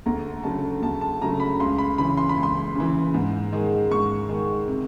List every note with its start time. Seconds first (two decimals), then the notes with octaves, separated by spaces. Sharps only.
0.06 D2 A#5
0.44 C#3 F#3 A3 A5
0.82 D2 A5
1.01 A5
1.22 C#3 F#3 A3 A#5
1.40 B5
1.60 C#2 C6
1.78 B5
1.98 C#3 E3 B5
2.17 C6
2.29 B5
2.37 C#2
2.43 C6
2.75 C#3 E3
3.14 G#2
3.52 D#3 G#3
3.91 G#2 C#6
4.29 D#3 G#3
4.68 C3